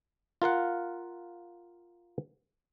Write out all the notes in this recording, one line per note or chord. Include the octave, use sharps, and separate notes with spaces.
F4 A#4 F5 F#5